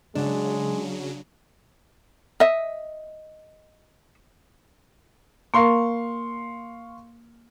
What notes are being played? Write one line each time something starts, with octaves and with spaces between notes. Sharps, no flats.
C#3 F#3 G#3 D4
D#5 E5
A#3 A#4 F5 C6 C#6